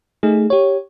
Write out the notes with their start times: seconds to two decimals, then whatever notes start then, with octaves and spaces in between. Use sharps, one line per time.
0.23 A3 D#4 G#4
0.50 G4 C#5